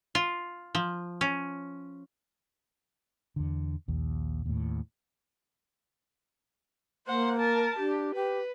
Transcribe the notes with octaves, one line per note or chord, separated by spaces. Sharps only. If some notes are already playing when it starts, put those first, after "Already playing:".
F4
F3
C#4
E2 D3
A#1 D#2
D#2 A2
A#3 C5 F#5
A#4 A5
D4 G4
G4 B4